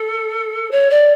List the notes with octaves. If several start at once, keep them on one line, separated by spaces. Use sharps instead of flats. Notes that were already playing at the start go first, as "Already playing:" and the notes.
Already playing: A4
C#5
D5